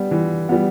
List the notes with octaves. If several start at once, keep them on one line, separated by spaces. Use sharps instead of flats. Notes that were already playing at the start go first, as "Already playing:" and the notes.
Already playing: G3 B3
E3
G3 B3